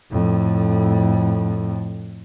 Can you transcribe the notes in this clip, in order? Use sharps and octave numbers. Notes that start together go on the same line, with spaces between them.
F2 A2